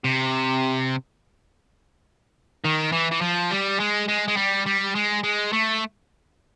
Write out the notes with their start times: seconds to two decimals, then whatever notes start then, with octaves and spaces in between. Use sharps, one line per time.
0.04 C3
2.64 D#3
2.92 E3
3.12 E3
3.21 F3
3.51 G3
3.79 G#3
4.08 G#3
4.28 G#3
4.37 G3
4.67 G3
4.95 G#3
5.23 G#3
5.52 A3